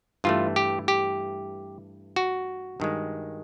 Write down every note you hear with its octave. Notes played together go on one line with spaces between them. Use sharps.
G2 E3 A3 F4
G4
G4
F#4
G2 D#3 G#3